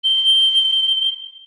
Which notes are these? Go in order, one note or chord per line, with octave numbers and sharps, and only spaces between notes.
G7